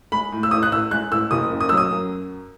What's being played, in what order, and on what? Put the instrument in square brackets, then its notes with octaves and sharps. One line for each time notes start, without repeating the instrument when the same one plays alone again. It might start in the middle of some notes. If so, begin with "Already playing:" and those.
[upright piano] G#3 B5
A2
E6
A1 D#6
F#6
A1 E6
G#3 F#6
A1 E6
F#1 D#6
F#2
D#6
F#3 E6
D#6
F#2